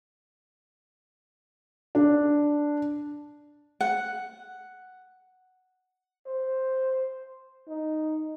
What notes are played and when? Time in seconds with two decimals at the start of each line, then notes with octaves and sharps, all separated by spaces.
1.95 D4
3.81 F#5
6.27 C5
7.68 D#4